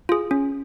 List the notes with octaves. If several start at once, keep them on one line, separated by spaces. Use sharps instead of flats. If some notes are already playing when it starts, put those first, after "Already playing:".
F4 G#4
C#4